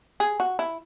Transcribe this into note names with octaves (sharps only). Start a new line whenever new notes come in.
G#4
F#4
E4